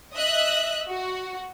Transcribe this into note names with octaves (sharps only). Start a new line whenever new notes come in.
D#5 E5 F#6
F#4